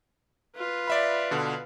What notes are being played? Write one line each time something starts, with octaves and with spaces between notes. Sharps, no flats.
F4 B4
D5 E5 B5
B2 D3